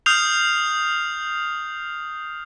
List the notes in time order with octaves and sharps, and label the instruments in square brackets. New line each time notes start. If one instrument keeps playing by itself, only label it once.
[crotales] D#6 F6 G6 C7 F7